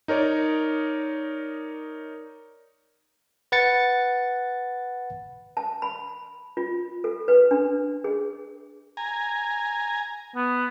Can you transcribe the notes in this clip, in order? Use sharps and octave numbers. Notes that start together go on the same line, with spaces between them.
D#4 A#4 C#5 D5
B4 F#5 A6 C#7
A5
B5
F4
A4
B4
D4
G#4
G#5 A#5
B3